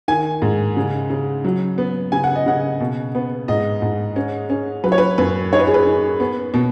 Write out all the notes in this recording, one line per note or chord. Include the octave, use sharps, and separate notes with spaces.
D#3 G#5
G#2
C#3
C#3
F#3
B3
C#3 G#5
F#5
D#5
C#3 F#5
B2
B3
G#2 D#5
G#2
C#4
C#4
F#3 B4
C#5
B4
F#2 B4
D#4 C#5
B4
G#4
B4
D#4
B3
B2